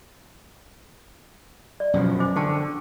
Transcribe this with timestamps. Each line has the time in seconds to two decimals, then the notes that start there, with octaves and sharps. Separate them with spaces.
1.80 D5
1.94 F#2 B2 F3
2.20 C5 G#5 D6
2.36 D3 G5 A5 C#6